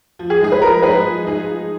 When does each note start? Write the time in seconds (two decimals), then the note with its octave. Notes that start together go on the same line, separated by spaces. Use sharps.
0.19 F3
0.30 G#4
0.41 G#3 D#4 G#4
0.52 B4
0.62 F3 A#4
0.82 G#3 D#4 G#4 B4
1.03 F3
1.24 G#3 D#4 G#4
1.46 F3